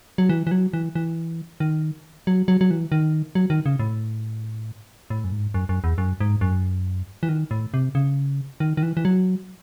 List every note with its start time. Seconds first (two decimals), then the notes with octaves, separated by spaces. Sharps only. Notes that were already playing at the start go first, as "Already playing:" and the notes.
0.18 F#3
0.29 E3
0.47 E3
0.51 F#3
0.73 E3
0.95 E3
1.60 D#3
2.27 F#3
2.48 F#3
2.61 F#3
2.71 E3
2.92 D#3
3.35 F#3
3.50 D#3
3.66 C#3
3.79 A2
5.10 A2
5.24 F#2
5.32 G#2
5.54 F#2
5.69 F#2
5.84 E2
5.98 F#2
6.20 G#2
6.41 F#2
7.23 E3
7.29 D#3
7.51 A2
7.74 C3
7.95 C#3
8.60 D#3
8.77 D#3
8.83 E3
8.97 E3
9.05 F#3